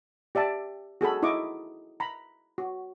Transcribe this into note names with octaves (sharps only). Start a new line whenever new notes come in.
G4 D5 E5 A5
F#4 G#4 A4 B5
D#4 E4 D#5 C#6 D6
A#5 B5
F#4